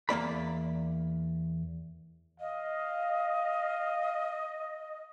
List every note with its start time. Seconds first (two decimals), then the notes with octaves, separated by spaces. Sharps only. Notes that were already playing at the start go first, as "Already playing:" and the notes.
0.09 E2 A#3 D5 B5
2.40 D#5 F5